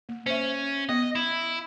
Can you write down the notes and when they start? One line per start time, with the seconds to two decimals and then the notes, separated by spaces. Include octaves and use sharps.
0.09 A#3
0.26 C#4 C5 E5
0.89 B3 D#5
1.15 E4